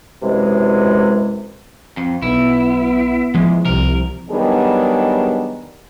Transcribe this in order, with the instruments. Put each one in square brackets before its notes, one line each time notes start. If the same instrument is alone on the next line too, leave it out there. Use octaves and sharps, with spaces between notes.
[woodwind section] F#2 C3 E3 G#3
[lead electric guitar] F2 [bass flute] C4
[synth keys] B1 [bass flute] B3 [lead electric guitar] E4
[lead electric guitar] E2 [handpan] F3 [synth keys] G#3
[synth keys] C2 C3 [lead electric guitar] A#4
[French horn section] D#3 F#3 G3 B3 D4 G#4